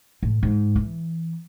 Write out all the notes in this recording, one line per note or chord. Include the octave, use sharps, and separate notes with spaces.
A2
G#2
E3